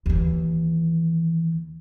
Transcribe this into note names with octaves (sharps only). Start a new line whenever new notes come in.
D#2 E3